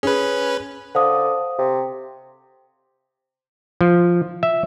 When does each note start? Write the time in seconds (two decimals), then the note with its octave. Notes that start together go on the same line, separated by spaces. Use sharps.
0.03 C#4 G#4 B4
0.95 D3 C5 F5 D#6
1.58 C3
3.81 F3
4.43 E5